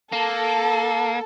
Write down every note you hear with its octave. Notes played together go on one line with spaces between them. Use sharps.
A#3 A4